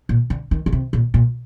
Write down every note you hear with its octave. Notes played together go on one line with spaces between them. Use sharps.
A#2
D3
D#3
D3
C3
A#2
A#2